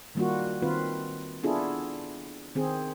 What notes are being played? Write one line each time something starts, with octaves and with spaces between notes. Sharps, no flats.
D#3 G3 A#3 F4 F#4
D#3 C4 F4 B4
B3 D4 E4 F4 G#4 A4
D#3 C4 G#4